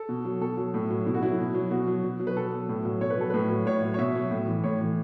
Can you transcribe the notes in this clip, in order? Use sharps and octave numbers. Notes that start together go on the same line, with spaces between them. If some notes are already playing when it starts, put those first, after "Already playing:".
Already playing: A4
B2
F#3
B2 A4
F#3
A2
F#3
B2 E4
F#4
F#3 E4
B2
F#3
B2 F#4
F#3
B2
F#3
B4
B2 A4
F#3
A2
F#3
B2 C#5
B4
F#3 A4
A2 B4
F#3
A2 C#5
F#3
C#5
B2 E5
F#3
A2
E3
A2 C#5
E3